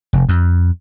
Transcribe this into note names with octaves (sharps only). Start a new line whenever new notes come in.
F1
F2